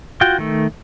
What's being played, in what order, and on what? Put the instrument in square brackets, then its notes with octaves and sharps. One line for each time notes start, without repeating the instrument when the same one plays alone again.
[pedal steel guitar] F4 F#4 G5
D#3 A3